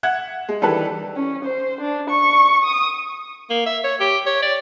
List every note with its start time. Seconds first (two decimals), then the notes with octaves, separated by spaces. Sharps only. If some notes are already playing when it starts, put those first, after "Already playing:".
0.03 E5 F#5 F#6 G#6
0.49 G#3
0.61 D#3 E3 G3 D4 A4 B4
1.16 C#4
1.45 C5
1.81 D4
2.10 C#6
2.64 D#6
3.50 A#3
3.66 E5
3.84 C#5
4.00 G4
4.26 C#5
4.42 D5